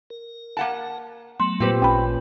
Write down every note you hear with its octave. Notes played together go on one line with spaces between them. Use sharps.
A#4
A#3 F#5 A5
F#3 A3 B3 C6
A#2 C4 G4 B4 C5
A1 C#4 G5 B5